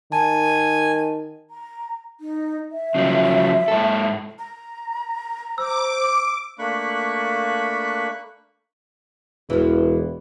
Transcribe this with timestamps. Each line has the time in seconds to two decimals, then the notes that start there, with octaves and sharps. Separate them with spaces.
0.12 D#3 G#5 A5
1.49 A#5
2.20 D#4
2.72 E5
2.95 C#3 F3 F#3
3.68 G#2 A4
4.39 A#5
5.58 C5 D6 E6
6.59 A3 A#3 D4 B5 C#6 F#6
9.50 E1 E3 F3